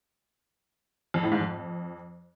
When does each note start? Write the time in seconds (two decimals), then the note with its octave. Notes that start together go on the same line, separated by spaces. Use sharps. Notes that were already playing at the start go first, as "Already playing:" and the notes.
1.14 F2
1.23 A2
1.32 G#2
1.40 F2